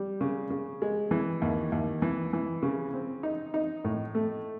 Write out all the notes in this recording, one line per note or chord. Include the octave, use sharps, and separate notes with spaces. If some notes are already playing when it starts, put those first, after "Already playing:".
Already playing: G3
C#3
C#3
G#3
E3
D#2
D#2
E3
E3
C#3
C4
D#4
D#4
A2
A3